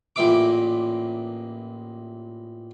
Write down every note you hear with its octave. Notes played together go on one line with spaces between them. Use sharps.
A1 A#2 E5 D6